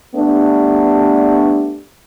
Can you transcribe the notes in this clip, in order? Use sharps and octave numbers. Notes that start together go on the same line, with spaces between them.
G3 A3 B3 D4